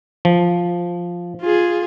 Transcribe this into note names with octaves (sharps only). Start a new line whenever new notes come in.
F3
F4 G#4